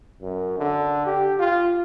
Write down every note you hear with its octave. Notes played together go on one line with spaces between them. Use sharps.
F#2
D3
G4
F4